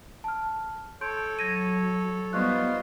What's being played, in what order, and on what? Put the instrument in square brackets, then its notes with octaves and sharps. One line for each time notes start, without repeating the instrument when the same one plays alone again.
[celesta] A5 F6
[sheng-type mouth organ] A4 C#5 [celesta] C6 G6 D7
[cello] F#3 [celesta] G#6 A#6 D#7
[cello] G3 B3 [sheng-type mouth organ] D#4 F4 C5 [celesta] C6 C#6 F#6